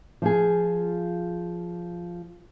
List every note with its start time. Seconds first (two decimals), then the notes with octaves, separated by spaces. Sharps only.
0.22 F3 F4 G#4